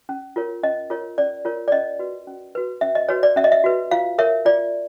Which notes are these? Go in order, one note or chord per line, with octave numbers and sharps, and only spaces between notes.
C#4
F4 A#4 C#5
C#4 D#5
F4 A#4 C#5
C#4 D5
F4 A#4 C#5
D5
C#4 D#5
F#4 B4
C#4
F#4 B4
C#4 E5
D#5
F#4 B4 C#5
D5
C#4 E5
D#5
E5
F#4 B4
F4 F5
A#4 C#5 E5
F4 D5